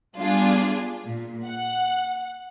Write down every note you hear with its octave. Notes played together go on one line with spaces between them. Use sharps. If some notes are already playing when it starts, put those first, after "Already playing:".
G3 B3 D4 F4 G#4
A#2
F#5